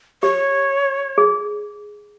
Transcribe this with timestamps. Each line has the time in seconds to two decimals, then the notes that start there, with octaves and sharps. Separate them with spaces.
0.22 G4 C#5
1.18 G#4